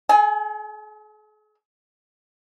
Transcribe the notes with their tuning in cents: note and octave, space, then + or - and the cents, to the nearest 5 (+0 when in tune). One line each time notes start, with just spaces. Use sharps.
G#4 +45 G#5 +0